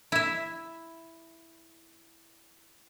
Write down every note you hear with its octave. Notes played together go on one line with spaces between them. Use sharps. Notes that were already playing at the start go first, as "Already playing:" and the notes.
E4 E5